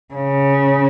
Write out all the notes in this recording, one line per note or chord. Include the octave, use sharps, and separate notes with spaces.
C#3